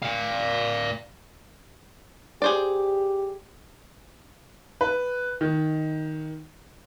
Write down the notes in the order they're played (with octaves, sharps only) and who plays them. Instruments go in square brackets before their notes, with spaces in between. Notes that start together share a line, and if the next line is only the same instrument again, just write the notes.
[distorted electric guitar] D5 F5
[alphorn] G4 [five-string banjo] G#4 C5 D5
[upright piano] B4
D#3